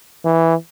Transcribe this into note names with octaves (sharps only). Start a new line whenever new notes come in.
E3